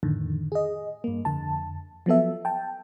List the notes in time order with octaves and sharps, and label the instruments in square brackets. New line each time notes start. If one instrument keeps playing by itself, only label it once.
[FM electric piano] F2 A2 D3 D#3
G#4 D#5
G2 A#3
F2 D3 A5
F3 F#3 B3 A4 E5
G5 A5